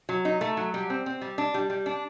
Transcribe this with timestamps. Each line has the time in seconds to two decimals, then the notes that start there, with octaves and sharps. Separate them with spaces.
0.09 F#3
0.25 D#4
0.41 A3
0.57 F#3
0.74 G3
0.90 C4
1.06 C4
1.21 G3
1.38 D4
1.54 G3
1.70 G3
1.86 D4